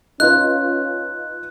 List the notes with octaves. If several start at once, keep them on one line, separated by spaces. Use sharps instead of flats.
C#4 D#4 F4 B4 F#6